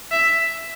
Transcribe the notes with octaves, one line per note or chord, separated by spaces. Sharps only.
E5